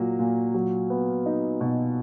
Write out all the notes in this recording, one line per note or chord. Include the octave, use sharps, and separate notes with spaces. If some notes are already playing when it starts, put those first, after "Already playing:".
Already playing: A#2 F#3 A#3
A#2
F#3
B3
D#4
B2